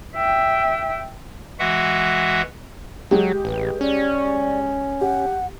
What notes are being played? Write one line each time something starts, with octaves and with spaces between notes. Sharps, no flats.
E5 G5
E3 G#3 F#4 E5 F#5
F#3 G#3 G4
A1 B4
C#4 D5
G4 F#5